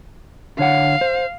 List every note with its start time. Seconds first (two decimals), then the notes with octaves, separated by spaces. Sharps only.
0.59 D3 C#5 F5 F#5
1.01 C5